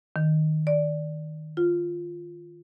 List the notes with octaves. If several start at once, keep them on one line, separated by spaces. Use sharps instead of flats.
D#3
D5
F4